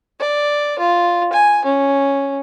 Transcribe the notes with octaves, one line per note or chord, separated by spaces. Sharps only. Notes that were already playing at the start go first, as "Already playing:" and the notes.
D5
F4
G#5
C#4